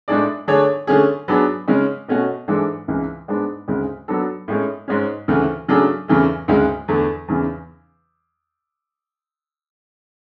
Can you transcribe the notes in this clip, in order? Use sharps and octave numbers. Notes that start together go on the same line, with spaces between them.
A2 G#3 D4 G#4 D5
D3 A3 D4 G#4 C#5
D3 A3 C#4 G#4
F#3 B3 D4 G#4
C#3 G#3 C#4
B2 A3 C#4 F#4
G#2 E3 G#3 D4 A4
C#2 C#3 E3
G#2 G#3 B3 D4
D2 C#3 G#3
F#3 B3 D4 A4
A2 G#3 C#4
G#2 G#3 C#4
D2 C#3 E3 A3
C#3 F#3 A3 D4 G#4
E2 C#3 E3 A3
D2 C#3 G#3
E2 D3 A3
E2 C#3 E3